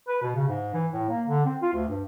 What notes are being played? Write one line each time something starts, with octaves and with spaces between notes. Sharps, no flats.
B4
B2
C#3
G#2
E3
A2
A#3
D3
C4
F4
D2
G2